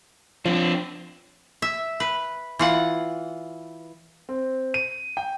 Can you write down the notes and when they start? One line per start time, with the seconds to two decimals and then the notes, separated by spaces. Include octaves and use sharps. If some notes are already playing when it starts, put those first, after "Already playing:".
0.46 F3 C4 D4
1.62 E5
2.00 B4
2.59 E3 F4 F#5
4.29 C4
4.74 D#7
5.17 G5